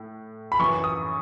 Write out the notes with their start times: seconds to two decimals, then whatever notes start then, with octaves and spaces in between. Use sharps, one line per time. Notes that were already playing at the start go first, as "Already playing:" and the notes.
Already playing: A2
0.52 B5
0.59 F#2 E3 C#6
0.84 D#6